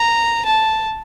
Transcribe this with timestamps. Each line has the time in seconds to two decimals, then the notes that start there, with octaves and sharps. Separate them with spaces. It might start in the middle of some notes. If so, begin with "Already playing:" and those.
Already playing: A#5
0.46 A5